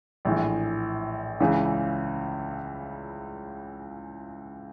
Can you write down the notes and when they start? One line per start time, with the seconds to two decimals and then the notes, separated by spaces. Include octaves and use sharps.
0.25 A#1 A2 E3
1.40 C#2 C#3 E3